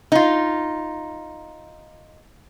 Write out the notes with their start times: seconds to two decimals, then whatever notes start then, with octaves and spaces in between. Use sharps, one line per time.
0.12 D#4 F4